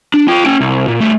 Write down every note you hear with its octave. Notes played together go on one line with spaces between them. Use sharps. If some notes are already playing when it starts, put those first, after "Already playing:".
D4
F4 G5
C#4 G5
C2
A#2
G3 A3